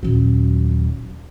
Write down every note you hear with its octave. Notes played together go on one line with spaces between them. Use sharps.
D#1 F#3